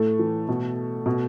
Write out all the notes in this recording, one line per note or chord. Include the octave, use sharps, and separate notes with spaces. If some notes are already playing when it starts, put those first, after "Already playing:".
Already playing: A2 A3
E3
B2
B2